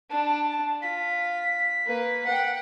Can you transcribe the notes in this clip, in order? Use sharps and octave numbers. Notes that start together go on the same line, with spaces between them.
D4 A5
A5
F4 B6
A#3 B4
F#5 G5